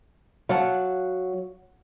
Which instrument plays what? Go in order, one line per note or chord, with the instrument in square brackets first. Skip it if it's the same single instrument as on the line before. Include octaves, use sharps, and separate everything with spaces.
[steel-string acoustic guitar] F#3 [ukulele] F5 F#5 A5